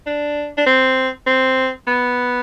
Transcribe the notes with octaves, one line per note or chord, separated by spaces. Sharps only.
D4
D4
C4
C4
B3